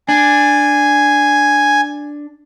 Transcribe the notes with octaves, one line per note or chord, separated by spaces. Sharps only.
D4 G#5